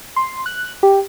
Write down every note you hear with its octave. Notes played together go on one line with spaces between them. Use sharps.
C6
F#6
G4